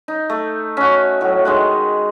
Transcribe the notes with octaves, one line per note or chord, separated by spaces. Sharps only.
D#4
A3
C#4 F#4
A2 F#3
D#3 G#3 F#5